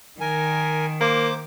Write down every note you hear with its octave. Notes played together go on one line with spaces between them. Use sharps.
D#3 A#4 G#5
A#3 C5 D6